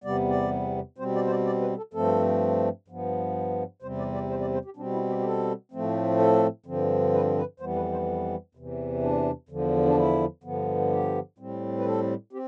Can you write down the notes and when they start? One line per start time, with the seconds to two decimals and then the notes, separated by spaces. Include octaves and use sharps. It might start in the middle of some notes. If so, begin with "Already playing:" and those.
0.04 E2 C3 G3 B3 D5
0.29 D5
0.98 B2 G3 C4 C5
1.15 D5
1.26 C5
1.30 D5
1.46 D5
1.61 B4
1.77 A4
1.94 G2 F3 A3 C4 A4
2.88 G2 F3 B3
3.82 E2 C3 G3 C4 C5
3.98 D5
4.14 D5
4.30 C5
4.41 D5
4.54 C5
4.65 G4
4.76 B2 G3 C4 D4
4.93 E4
5.09 G4
5.19 G4
5.24 A4
5.72 A2 F3 A3 C4
6.19 A4
6.66 G2 D3 F3 C4
7.14 B4
7.37 B4
7.60 F2 E3 G3 B3 C5
7.76 B4
7.92 C5
8.55 E2 C3 E3
9.03 D4
9.49 E2 D3 F3
9.86 D4
9.96 E4
10.44 G2 D3 F3 B3
10.91 G4
11.38 A2 G3 C4
11.78 B4
11.86 A4
12.33 C4 G4